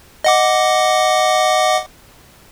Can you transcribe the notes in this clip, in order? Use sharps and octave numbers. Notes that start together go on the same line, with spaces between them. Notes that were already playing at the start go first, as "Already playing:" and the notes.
D#5 F#5 D6